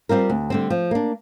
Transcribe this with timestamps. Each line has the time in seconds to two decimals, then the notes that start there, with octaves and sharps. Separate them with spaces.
0.09 G3 C4 F4 A#4
0.30 D2
0.50 D3 G3 C4
0.70 F3
0.91 A#3 D4